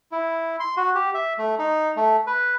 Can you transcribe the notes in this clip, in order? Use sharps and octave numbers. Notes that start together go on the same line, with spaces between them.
E4
C6
F#4
G4
E5
A3
D#4
A3
B4